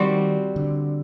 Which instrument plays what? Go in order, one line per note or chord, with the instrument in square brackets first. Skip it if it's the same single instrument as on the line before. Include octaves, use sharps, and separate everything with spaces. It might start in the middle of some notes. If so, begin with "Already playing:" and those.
Already playing: [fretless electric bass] D#3 [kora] G3 C4 F#4
[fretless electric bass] D3